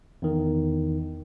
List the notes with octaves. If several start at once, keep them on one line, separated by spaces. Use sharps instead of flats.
E2 D#3